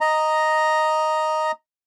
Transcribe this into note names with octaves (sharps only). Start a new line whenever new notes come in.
D#5 A#5